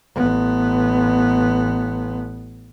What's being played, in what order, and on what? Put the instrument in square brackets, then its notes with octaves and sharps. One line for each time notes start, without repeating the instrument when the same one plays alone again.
[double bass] A1 B3